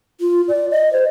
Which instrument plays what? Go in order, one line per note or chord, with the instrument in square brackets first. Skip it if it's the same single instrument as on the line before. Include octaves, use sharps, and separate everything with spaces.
[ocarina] F4
D5
D#5
C5